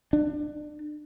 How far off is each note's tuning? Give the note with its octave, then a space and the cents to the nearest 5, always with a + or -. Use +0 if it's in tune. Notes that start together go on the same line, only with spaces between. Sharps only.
D4 +30